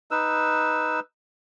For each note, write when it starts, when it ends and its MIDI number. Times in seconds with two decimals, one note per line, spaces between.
0.11 1.00 63
0.11 1.00 71
0.11 1.00 88